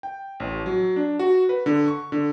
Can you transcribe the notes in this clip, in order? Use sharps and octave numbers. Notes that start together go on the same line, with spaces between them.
G5
A1
F#3
D4
F#4
B4
D3
C#6
D3